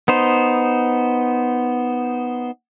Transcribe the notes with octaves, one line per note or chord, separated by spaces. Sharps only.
B3 D#4 C5